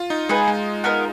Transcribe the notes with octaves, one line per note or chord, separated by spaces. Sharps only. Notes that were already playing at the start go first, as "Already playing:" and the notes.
Already playing: F4
D#4
G#3 D#4 G#4 B4
G#3
B3 D#4 A#4 D#5